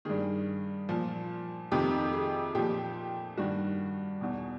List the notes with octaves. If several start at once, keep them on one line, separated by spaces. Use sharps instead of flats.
G2 D#3 G#4
A#2 F3
F2 C3 D#3 G4
G#4
A#2 F3 G4
G2 D#3 F#4
E2 B2